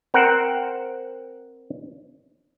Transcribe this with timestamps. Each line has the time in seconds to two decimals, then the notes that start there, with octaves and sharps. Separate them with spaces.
0.14 C4 A#4 C5 F#5 A#5